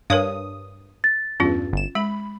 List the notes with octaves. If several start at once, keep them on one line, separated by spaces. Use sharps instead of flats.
G2 A#4 C#5 F5 D#6
A6
E2 G2 C#4 F4
G1 E7
G#3 B5